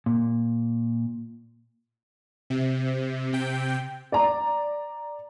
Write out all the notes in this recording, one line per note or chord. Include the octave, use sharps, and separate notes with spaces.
A#2
C3
C3 G5
D5 A#5